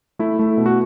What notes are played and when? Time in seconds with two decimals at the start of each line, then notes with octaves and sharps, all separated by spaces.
0.19 A3 E4
0.39 A3
0.57 B2
0.66 F#4